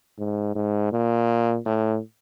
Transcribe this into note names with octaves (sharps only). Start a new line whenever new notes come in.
G#2
G#2
A#2
A2